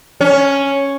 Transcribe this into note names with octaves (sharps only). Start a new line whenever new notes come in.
C#4